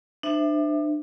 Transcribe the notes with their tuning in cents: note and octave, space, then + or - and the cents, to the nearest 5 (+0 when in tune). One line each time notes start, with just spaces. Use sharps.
D4 +30 C5 -10 E5 +0